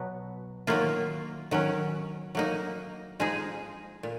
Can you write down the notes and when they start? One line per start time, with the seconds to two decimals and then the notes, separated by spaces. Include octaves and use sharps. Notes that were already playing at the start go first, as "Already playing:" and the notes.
Already playing: B2 F#3 B3
0.67 D#3 F#3 A#3 F4
1.51 D#3 F#3 C#4
2.35 F#3 A#3 D#4
3.20 F3 G#3 D#4 G#4
4.03 A#2